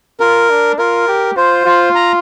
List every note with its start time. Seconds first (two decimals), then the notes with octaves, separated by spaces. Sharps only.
0.20 F4 A#4
0.50 D4
0.79 F4 A#4
1.08 G4
1.36 F4 C5
1.65 F4
1.95 A#5